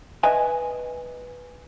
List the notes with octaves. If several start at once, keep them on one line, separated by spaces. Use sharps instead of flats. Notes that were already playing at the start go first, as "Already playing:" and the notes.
B4 D#5 E5 G#5